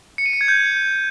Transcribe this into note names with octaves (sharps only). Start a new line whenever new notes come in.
C#7
D#7
C#7
G#6
G6